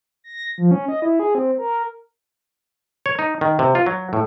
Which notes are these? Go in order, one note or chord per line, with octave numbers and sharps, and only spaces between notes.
A#6
F3
C#4
D#5
E4
G#4
C4
A#4
C#5
D#4
D#3
C3
F4
F#3
A2